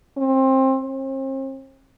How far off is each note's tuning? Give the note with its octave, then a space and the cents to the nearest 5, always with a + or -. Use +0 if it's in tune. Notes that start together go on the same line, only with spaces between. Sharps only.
C4 +25
C4 +40